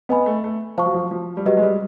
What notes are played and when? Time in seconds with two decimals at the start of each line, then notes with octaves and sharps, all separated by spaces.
0.09 B3 B4 D#5 G#5 B5
0.26 A3
0.44 A3
0.78 F3 C5 F5 A5 C#6
0.86 F#3
0.94 F3
1.11 F3
1.37 G3
1.45 F#3 G4 B4 D#5
1.57 G#3
1.62 G3